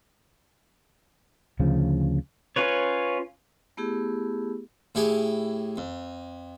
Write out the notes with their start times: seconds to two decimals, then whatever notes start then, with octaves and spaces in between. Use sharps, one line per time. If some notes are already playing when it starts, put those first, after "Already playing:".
1.60 D2 C#3 F3
2.56 C#4 F4 B4 C#5
3.77 A3 B3 E4 G4 G#4
4.95 A2 E4 G4 G#4
5.77 F2